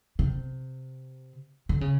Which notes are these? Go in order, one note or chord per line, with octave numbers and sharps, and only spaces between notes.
C3
D3
C#3